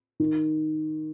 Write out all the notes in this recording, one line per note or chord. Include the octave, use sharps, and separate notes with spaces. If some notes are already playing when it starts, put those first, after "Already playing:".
D#3